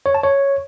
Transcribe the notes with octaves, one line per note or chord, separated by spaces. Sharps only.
C#5
A5
C#5